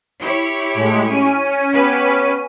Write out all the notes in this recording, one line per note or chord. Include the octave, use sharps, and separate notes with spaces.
E4 G4 C#5
A2 G#3
C#4 D#7
B3 G4 B4